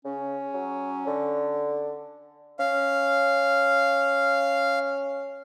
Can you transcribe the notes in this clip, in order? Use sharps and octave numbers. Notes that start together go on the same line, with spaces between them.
C#3 C#4
F#3
D3
C#4 F5